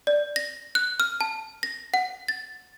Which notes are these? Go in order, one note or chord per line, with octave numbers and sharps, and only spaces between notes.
D5
A#6
F#6
F6
A5
A#6
F#5
A6